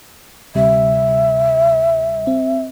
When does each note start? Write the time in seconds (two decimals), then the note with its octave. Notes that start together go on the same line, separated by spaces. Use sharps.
0.55 D2 C3 G3 E5
2.27 C4